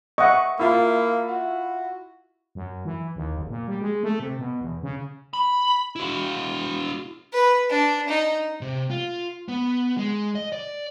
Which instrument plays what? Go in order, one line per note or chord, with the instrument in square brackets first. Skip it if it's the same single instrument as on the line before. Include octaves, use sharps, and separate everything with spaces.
[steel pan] D#5 E5 F#5 [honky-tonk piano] C#6
[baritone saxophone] A#3 [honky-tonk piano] E4 F4
[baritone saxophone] F#4
[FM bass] F#2
E3
D#2
F#1
A#2
G3
G#3
A3
C3
B2
E2
C#3
[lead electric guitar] B5
E4 F#4
[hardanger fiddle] B4
D4
D#4
[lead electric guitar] C3
F4
B3
G#3
D#5
D5